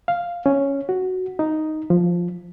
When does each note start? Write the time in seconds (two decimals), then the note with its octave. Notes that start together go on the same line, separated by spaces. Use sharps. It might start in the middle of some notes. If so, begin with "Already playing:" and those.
0.08 F5
0.46 C#4
0.89 F#4
1.39 D#4
1.90 F3